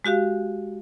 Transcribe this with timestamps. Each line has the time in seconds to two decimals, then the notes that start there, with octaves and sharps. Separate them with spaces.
0.05 G#3 F#4 G4 F5